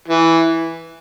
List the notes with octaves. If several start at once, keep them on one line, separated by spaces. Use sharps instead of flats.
E3